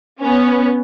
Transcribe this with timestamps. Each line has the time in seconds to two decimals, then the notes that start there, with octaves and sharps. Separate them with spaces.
0.20 B3 C#4